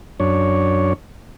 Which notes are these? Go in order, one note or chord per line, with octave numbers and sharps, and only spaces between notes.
F#2 D4 C#5